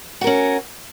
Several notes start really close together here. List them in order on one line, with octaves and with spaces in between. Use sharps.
F#4 A#4 C#4